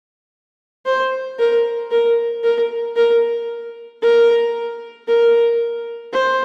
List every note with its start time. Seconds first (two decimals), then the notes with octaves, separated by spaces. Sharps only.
0.86 C5
1.39 A#4
1.91 A#4
2.44 A#4
2.96 A#4
4.02 A#4
5.08 A#4
6.13 C5